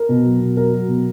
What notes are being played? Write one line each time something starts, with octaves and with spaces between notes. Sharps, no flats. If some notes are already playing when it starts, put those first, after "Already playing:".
Already playing: A#4
B2
F#3
B2
F#3 A#4
F#3
B2